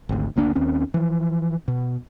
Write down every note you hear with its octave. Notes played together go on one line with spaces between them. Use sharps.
G#1 D2
F#1 D2 A#3 D4
D#2 D#3 C4 C#4
E3 F3
B2